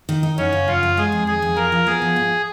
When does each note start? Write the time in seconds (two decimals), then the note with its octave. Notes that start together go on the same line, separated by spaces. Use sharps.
0.09 D#3
0.23 D#4
0.37 F#2 C#4
0.53 C#3
0.67 F#2 F4
0.83 F#3
0.97 G#3 G#4
1.12 F2
1.27 D#3 G#4
1.42 F2
1.56 F3 A#4
1.72 F3
1.86 B3 G#4
2.02 F3
2.16 G#2